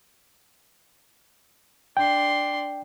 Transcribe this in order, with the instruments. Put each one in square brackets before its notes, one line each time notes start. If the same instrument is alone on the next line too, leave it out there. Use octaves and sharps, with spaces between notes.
[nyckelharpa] D4 C6 [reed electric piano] G5